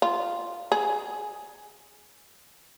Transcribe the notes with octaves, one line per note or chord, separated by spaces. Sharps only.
F4
G#4